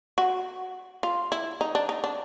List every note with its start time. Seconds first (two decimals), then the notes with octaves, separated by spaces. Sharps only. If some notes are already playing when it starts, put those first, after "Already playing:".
0.18 F#4
1.03 F4
1.32 E4
1.61 D#4
1.75 D4
1.89 D#4
2.04 D4